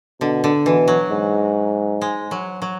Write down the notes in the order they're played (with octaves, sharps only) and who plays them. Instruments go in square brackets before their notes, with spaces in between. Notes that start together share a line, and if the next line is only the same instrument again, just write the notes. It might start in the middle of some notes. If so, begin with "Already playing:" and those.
[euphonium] B2 [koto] D3
[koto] D3
[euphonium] B2 [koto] E3
[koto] F#3
[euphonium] G#2
[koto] G#3
F#3
F#3